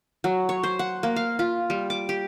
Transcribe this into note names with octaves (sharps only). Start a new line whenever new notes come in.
F#3
C#5
C5
F#5
A#3
F5
F4
G3
D6
G4